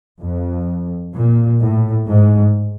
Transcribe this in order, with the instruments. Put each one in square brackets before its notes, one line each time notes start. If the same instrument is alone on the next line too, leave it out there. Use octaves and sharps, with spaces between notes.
[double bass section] F2
A#2
A2
G#2